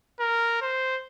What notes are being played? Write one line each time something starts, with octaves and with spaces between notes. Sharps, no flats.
A#4
C5